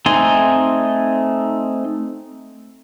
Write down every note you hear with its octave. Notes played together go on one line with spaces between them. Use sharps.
A3 C4 D#4 G#5 C6